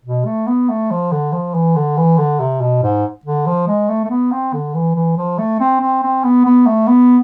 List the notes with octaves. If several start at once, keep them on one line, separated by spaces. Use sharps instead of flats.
B2
A3
B3
A3
F3
D3
F3
E3
D3
E3
D3
C3
B2
G#2
D3
F3
G#3
A3
A3
B3
C4
D3
E3
E3
F3
A3
C4
C4
C4
B3
B3
A3
B3